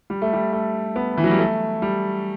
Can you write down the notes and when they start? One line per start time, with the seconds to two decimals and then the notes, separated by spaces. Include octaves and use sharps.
0.10 G3
0.22 A3
0.33 G3
0.53 A3
0.96 B3
1.18 E3
1.24 F#3
1.31 G3
1.39 A3
1.82 G3